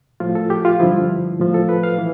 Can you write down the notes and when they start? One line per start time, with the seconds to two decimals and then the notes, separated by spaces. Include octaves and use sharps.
0.20 A2 F3 F4
0.35 A4
0.50 G4
0.65 F4
0.80 G2 D3 F3 E4
1.39 A2 F3
1.54 A4
1.69 B4
1.83 F5
1.98 E3